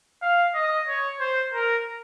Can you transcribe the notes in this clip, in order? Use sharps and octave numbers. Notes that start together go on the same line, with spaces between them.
F5
D#5
C#5
C5
A#4